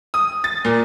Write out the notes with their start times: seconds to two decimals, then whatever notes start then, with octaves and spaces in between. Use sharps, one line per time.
0.14 D#6
0.44 A6
0.65 A#2